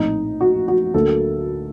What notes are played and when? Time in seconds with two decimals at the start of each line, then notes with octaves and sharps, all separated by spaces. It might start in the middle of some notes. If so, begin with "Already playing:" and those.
Already playing: A#1 A2 A3 C4 D#4
0.41 F#4
0.68 F#4
0.94 D2 D3 F#3 A#3 A4